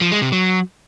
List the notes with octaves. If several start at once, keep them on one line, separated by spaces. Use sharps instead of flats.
F3
G#3
C3
F#3